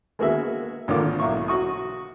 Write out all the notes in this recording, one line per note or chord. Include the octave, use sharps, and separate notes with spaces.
G#3 A#3 B3 F#4 G#4 E5
G#1 D3 A#3 F4 D6
B1 E4 C#6
F#4 C#6 D#6